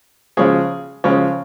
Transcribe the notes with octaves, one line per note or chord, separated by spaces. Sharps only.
C#3 F3 G#3 C#4 G#4
C#3 F3 G#3 C#4